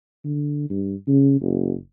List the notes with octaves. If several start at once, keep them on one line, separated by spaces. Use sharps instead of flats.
D3
G2
C#3
F#1